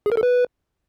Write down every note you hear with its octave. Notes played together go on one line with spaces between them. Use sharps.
G#4
A#4
A4
B4